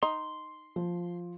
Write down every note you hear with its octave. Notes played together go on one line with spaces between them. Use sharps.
D#4 C6
F3